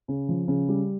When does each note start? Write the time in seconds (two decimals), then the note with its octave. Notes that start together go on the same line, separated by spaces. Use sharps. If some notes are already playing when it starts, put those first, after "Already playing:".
0.08 C#3
0.29 F3
0.48 C#3
0.68 G3